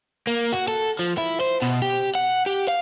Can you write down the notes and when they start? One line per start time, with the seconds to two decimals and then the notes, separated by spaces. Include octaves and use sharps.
0.27 A#3
0.52 F#4
0.68 A4
0.99 F3
1.18 E4
1.40 C5
1.62 B2
1.82 G4
2.15 F#5
2.46 G4
2.68 F5